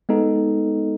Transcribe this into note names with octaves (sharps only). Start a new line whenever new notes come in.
G#3 B3 D#4 A4